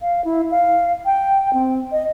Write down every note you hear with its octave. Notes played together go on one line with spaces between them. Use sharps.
F5
E4
F5
G5
C4
D#5